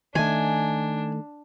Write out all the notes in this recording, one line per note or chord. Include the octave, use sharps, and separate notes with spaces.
D#3 A3 D4 G#5